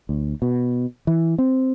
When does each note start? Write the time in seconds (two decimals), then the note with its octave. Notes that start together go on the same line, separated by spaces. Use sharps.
0.09 D2
0.42 B2
1.07 E3
1.38 C4